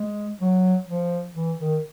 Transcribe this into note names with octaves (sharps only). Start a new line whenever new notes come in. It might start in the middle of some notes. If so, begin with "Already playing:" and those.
Already playing: G#3
F#3
F3
E3
D#3